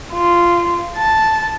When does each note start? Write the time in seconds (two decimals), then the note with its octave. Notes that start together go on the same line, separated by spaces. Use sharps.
0.12 F4
0.97 A5